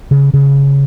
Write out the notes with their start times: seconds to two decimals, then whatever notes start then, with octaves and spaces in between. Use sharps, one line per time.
0.11 C#3
0.34 C#3